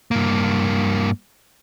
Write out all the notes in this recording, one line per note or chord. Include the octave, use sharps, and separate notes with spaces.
G2 A#3